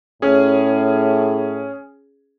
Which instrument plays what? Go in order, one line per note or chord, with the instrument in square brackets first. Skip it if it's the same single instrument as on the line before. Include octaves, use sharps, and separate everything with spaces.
[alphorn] A2 [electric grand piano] C#4 G#4